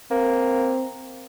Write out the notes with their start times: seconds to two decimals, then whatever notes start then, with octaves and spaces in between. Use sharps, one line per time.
0.11 A#3 C4